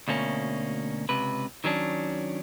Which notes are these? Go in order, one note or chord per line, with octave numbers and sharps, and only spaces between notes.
D2 B2 A#3 C#4
C#2 C3 B4
D#3 F#3 C#4 D4